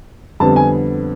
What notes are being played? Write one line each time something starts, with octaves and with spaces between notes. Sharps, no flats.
F2 D3 G3 B3 A5
G#5